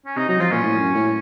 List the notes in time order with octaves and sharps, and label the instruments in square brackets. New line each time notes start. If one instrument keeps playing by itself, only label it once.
[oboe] C#4
[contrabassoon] C3 [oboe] D#4
[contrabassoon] F#3 [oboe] D#4
[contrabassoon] F3 [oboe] F4
[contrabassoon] A#2 [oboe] C#4
[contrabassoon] A2
F#2
A2